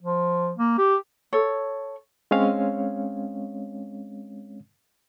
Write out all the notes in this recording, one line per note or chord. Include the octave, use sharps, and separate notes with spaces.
F3
A#3
G4
A4 C#5
G#3 C4 C#4 C#5 F5